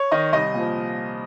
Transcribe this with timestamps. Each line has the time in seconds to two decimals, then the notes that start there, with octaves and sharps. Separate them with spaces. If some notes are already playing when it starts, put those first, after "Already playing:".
Already playing: C#5
0.12 D#3 D#5
0.33 C2 D#5
0.54 A#2 F3